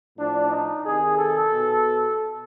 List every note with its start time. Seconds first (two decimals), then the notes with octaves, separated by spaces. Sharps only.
0.17 A2 F3 D4
0.51 D#4
0.84 C3 D#3 G#4
1.17 A4
1.50 B2